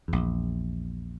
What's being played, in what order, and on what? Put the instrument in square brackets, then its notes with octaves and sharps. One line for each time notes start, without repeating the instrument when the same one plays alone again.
[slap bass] A#1 E2